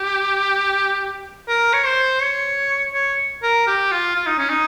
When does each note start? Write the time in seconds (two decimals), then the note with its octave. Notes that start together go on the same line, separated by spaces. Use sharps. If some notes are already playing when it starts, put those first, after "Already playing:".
Already playing: G4
1.49 A#4
1.73 C#5
1.86 C5
2.22 C#5
2.94 C#5
3.43 A#4
3.67 G4
3.92 F4
4.16 F4
4.26 D#4
4.38 C#4
4.50 D#4